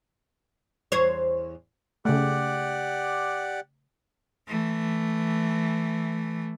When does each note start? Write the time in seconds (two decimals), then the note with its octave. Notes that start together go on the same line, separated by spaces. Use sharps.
0.92 E2 C5 C#5
2.05 C#3 A3 G4 D5 F#5
4.48 E3 A3